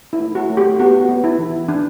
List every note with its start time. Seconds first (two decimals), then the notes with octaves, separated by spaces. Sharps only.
0.13 E4
0.20 A3
0.35 F#4
0.50 A3
0.57 G4
0.79 B3 F#4
1.09 B3
1.24 E4
1.39 E3
1.68 E3 D4